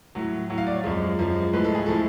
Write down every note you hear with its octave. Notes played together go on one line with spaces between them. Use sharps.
A2 F#3
A2 F#3
F5
D5
C#5
F#2 F3 G#3
F#2 F3 G#3
A2 F3 G#3 B4
A4
G#4
A2 F3 G#3 A4